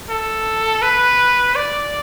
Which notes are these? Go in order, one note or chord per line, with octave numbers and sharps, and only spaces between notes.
A4
B4
D5